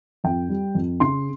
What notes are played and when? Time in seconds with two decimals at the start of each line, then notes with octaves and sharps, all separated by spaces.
0.24 F2 G5
0.49 G3
0.75 F2
1.00 C#3 C6